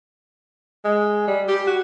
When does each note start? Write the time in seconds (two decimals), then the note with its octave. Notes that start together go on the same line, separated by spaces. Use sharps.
0.85 G#3
1.28 G3
1.48 G4
1.67 F#4